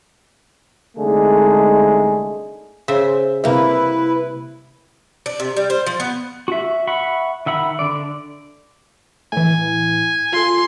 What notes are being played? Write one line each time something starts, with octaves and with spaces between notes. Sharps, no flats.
C2 D3 G#3 A3 D#4 G#4
C#3 C5 E5
C3 G3 A#3 E4 B4 E5
D4
C3
G3
C5
F3
B3
F#4 E5
E5 F#5 B5 C#6
D#3 E5 F#5 B5
D3 D5
A2 E3 G#5
F4 A4 C6